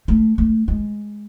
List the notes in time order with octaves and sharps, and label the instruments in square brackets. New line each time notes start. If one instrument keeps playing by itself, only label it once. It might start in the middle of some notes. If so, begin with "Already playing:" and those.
[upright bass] A3
A3
G#3